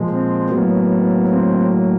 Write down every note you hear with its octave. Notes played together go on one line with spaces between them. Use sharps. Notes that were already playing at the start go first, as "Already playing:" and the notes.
Already playing: A#2 F3 G#3
C4
A2 F#3 A#3 B3
C4